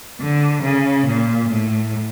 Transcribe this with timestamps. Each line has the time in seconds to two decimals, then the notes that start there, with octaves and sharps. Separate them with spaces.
0.20 D3
0.63 C#3
1.06 A#2
1.49 A2